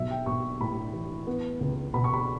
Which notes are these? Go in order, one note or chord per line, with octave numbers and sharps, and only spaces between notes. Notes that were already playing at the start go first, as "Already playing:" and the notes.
Already playing: B1 F#3 E5
G5
B1 C#6
A2 B5
E3
B3
C#2
B2 B5
C#6
B5